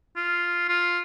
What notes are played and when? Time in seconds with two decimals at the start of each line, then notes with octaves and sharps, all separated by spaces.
0.16 F4
0.69 F4